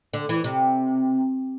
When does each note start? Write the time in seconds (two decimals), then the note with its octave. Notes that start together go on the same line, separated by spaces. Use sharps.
0.14 D3
0.29 E3
0.44 C3